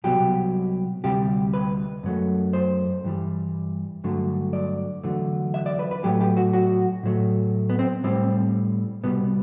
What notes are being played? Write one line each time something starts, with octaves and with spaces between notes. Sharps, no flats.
C2 B2 F#3 G4
D2 C3 G3 G4
B4
F#2 F#3 A3
C5
G2 E3 G3
G2 D3 F#3 A3
D5
E2 D3 F#3 A3
E5
D5
B4
B4
A2 F#3 A3 G4
G4
F#4
F#4
A2 F#3 A3
B3
C4
A2 G3 C4
C2 B2 G3 B3